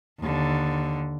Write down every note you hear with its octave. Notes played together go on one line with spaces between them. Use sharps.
D#2 D3